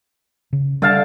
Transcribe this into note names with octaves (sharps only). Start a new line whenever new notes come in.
C#3
D3 G3 F5 A5